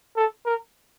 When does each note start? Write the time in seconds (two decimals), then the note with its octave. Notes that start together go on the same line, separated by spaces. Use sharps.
0.16 A4
0.45 A#4